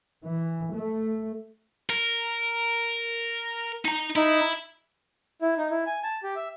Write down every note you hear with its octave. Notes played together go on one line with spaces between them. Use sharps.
E3
A3
A#4
D#4 A#5
D#4 E4
E4
D#4
E4
G#5
A5
G4
E5